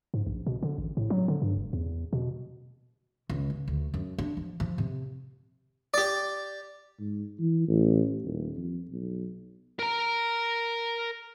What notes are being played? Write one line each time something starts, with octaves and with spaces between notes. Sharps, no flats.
G#2
A#1
B2
D3
A1
A2
F#3
D3
G2
E1
E2
B2
C#2
C#3
D2
F#2
D4
F3
F3
C3
G4 D5
G#2
E3
A1
D#1
F2
B1
A#4 A#5